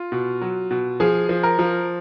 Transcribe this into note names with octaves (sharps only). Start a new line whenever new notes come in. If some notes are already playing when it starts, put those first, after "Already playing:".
Already playing: F4
B2
F#3
B2
F3 G#4
F3
A#4
F3